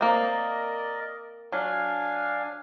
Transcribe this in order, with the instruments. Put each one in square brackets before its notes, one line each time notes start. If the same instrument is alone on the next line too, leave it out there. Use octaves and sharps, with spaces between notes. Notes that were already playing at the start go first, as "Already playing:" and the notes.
[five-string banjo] A#3 C4 [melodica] A#4 D5 D#5
[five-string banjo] F#3 [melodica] D4 F5 G#5